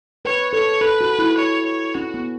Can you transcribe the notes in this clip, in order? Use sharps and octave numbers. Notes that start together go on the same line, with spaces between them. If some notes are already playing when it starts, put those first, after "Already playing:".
B4 C#5
A4 C#5
A4 B4
F#4
E4
C#5
C#5
C#4 F#4
B3